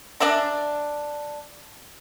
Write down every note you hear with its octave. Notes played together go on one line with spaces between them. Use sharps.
D4 D5 E5 A#5